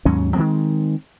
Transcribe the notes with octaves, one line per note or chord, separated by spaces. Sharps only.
D#2 G#2 F#3 C#4
D#3 F3 G#3 C4